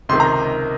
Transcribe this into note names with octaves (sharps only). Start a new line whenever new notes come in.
C#2 C3 D#3 C6
A#5